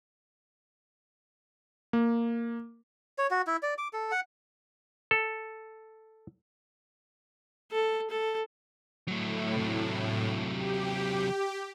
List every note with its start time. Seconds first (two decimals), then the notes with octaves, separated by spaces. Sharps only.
1.93 A#3
3.18 C#5
3.31 F#4
3.47 E4
3.63 D5
3.78 D6
3.93 A4
4.11 F#5
5.11 A4
7.71 A4
8.10 A4
9.08 A2 F#3 A3
9.56 C3 F#3
10.51 G4